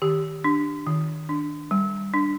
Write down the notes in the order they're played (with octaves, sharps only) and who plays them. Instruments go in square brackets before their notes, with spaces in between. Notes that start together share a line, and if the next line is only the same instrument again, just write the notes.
[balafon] D#3 G4
D4
D#3
D4
G3
D4